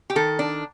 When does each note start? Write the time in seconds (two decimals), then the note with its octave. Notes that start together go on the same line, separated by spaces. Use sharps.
0.10 G4
0.16 D#3 A4
0.39 D4